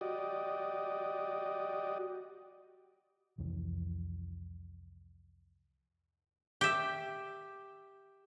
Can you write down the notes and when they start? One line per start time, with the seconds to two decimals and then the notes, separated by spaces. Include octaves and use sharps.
0.01 F#4 G4 D5 D#5
3.38 C2 F2 E3
6.61 G4 E5